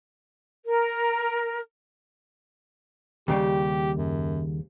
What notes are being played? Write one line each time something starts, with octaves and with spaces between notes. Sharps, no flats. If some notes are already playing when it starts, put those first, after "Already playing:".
A#4
D#2 C#3 G3 G4
F#2